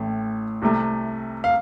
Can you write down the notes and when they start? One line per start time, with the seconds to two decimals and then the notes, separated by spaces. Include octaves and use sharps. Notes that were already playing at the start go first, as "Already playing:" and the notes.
Already playing: A1 A2 A3
0.62 C2 C3 A3
1.44 F5